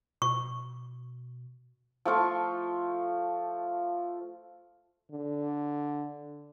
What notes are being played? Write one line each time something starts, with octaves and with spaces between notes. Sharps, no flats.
B2 C#6
F3 A3 F4 C#6
D3